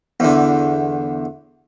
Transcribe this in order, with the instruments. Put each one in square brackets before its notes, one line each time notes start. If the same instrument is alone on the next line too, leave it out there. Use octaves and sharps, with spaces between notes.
[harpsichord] E2 D3